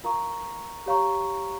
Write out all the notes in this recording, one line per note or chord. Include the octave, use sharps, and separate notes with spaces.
F4 A#4 F5 A#5 C#6
G4 C#5 F5 A#5 C#6